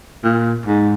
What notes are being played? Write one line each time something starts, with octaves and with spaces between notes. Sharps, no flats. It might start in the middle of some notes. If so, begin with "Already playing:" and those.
A#2
G#2